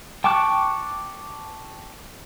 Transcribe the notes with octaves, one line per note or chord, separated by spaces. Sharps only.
G5 A5 C#6 D6 F#6